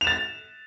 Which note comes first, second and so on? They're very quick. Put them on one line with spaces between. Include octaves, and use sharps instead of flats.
F7 E7 A6